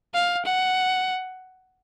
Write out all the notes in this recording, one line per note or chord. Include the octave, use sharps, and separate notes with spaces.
F5
F#5